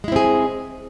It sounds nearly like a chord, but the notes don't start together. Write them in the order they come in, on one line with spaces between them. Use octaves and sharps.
G#3 E4 C4 G#4